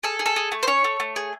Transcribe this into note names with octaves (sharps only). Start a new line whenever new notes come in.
G#4 A4
G#4
A4
G#4
A3
C5
C#4 C#5
A3
A3
G#4